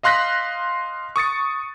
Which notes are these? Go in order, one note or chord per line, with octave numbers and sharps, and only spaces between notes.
D#5 F5 C6 F#6 A#6 B6
C#6 D#6 A6 C#7